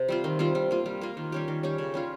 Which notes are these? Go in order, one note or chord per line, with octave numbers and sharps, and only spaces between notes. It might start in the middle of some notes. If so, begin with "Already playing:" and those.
Already playing: C3
G3 C4 F4
D#3
G3 C4 F4
G3
A#3 F4
G3
A#3 F4
D#3
G3 C#4 G4
D#3
G3 C#4 G4
C#3
G3 C#4 F4